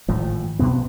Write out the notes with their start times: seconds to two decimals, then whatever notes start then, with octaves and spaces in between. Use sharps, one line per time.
0.08 G#1 A2 F3
0.59 A#1 B2 B3 C4